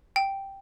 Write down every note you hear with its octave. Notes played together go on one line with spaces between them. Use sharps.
G5